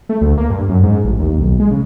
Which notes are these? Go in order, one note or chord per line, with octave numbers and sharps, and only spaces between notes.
A3
D2
A#3
G2
F#2
G#2
A1
D#2
B1
G#3
C#3